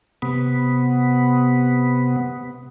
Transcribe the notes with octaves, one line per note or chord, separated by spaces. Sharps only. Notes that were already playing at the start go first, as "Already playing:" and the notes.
C3 B3